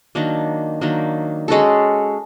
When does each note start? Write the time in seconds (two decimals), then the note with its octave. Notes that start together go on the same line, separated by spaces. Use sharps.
0.15 D#3 F#3 A#3 D4
0.81 D#3 F#3 A#3 D4
1.48 G#3 C#4 F#4 A4